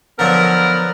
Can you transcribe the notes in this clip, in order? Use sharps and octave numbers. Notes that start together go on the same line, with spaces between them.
D3 F3 F#3 B3 A#4